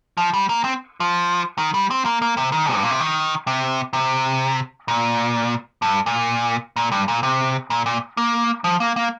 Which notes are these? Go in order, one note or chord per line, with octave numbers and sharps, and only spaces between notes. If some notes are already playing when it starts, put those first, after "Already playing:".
F3
G3
A#3
C4
F3
D#3
G3
C4
A#3
A#3
C3
D#3
G2
A#2
C3
D#3
C3
C3
A#2
G2
A#2
A#2
G2
A#2
C3
A#2
A#2
A#3
F3
A#3
A#3